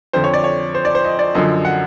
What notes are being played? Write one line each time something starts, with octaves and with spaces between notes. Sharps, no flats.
F2 D3 F3 C5
C#5
D5
C#5
C5
D5
C5
D#5
D5
F#2 D3 F3 D#5
F#5